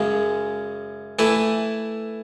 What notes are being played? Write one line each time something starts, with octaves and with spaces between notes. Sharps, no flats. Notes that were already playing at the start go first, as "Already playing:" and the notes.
Already playing: F#2 C#3 G#3
E3 A3 E4 B4 E5